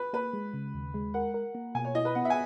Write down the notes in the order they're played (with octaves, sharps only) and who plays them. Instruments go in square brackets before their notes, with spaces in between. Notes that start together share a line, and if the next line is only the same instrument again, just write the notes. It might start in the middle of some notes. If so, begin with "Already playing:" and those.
Already playing: [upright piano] B4
[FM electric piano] A#3 [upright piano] B4
[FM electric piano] G#3
C#3
D#2
G#3
[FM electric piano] A#4 [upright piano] F#5
[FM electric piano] A#4
A#3
[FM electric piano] B2 [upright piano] G#5
[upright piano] C#5
[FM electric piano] E4 [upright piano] D#5
[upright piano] B4
[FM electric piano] B3 [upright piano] F#5
[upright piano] E5
G#5